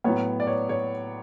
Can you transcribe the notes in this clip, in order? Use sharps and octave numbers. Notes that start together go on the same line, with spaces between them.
A2 F#3 B3 C#5
D5
C#5
C#5